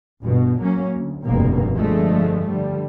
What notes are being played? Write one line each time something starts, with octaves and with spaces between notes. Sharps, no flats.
G1 B2
F#3 A#3 C#4
D2
F1 D2 G2 B2 A#3
G2 D3 F3 G#3 A3
D3 G3